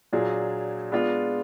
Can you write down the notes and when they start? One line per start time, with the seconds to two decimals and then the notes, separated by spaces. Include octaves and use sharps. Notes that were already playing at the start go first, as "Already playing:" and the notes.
0.13 A#2 F#3 D4 G#4
0.92 G#3 B3 D4 F4